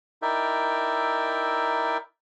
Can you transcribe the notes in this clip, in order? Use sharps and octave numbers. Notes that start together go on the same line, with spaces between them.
D#4 E4 A#4 D5 E5 G5